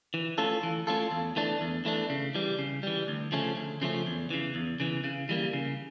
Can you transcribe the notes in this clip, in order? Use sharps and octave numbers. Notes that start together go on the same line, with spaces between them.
E3
A3 C#4 F4 A4
E3
A3 C#4 F4 A4
E2
E3 A3 D4
E2
E3 A3 D4
C#3
E3 G3
C#3
E3 G3
D2
C#3 F3 A3 C#4
D2
C#3 F3 A3 C#4
E2
C#3 E3
E2
C#3 E3
C#3
E3 G3 A#3
C#3